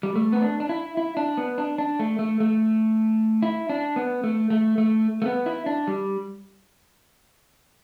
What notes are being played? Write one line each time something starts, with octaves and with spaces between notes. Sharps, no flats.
G3
A3
B3
D4
D4
E4
E4
D4
B3
D4
D4
A3
A3
A3
E4
D4
B3
A3
A3
A3
A3
B3
E4
D4
G3